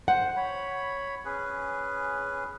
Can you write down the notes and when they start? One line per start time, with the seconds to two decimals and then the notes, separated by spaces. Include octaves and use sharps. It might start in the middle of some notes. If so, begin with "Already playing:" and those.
0.08 C5 F#5
0.36 C#5 B5
1.25 C#4 G#4 B4